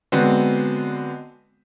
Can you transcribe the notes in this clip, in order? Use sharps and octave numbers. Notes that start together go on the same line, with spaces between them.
D3 F#3 G#3 B3 C4